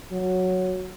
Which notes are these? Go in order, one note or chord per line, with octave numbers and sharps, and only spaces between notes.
F#3